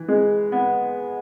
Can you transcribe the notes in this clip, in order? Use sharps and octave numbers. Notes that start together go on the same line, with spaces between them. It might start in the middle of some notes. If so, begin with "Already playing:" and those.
Already playing: E3
G#3
B3